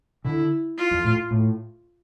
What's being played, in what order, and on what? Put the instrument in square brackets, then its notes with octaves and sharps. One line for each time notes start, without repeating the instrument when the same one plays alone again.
[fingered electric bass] D3 [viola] E4
[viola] F4
[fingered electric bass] F2
A2
A2